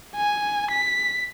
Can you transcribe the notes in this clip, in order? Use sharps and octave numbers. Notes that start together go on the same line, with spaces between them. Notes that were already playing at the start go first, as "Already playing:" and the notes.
G#5
B6